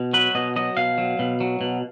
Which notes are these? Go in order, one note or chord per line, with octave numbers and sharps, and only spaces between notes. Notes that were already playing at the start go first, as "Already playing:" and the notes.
Already playing: B2
F#3 B4
B2 D#5
F#3 D#5
B2 F5
F#3
B2
F#3
B2